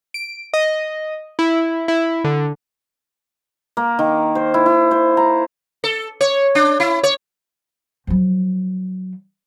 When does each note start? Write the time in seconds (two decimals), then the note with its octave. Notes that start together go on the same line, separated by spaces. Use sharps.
0.14 D7
0.54 D#5
1.39 E4
1.88 E4
2.24 D3
3.77 A#3
3.99 D#3
4.35 C5
4.54 E4
4.66 E4
4.91 C5
5.17 A#5
5.84 A4
6.21 C#5
6.55 D4
6.80 E4
7.03 C#5
8.07 F3 F#3